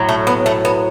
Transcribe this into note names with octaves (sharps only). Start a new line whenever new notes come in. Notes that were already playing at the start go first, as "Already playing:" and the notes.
Already playing: A2 F#3
A3
B3
A3
B3